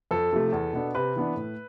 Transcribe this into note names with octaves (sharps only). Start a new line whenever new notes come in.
F2 A4
C3 F3 A3
E2
B2 B3 D4
C3 B4
E3 B3 D4
A2